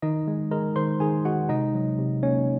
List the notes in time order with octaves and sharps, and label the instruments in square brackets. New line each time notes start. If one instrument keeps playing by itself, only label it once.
[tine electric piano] D#3 D#4 D#5
G#3
G#3 A#4 A#5
D#3 C5 C6
D#3 G#4 G#5
G#3 F#4 F#5
C3 D#4 D#5
F#3
C3
A#3 C#4 C#5